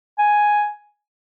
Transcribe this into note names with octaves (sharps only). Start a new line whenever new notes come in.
G#5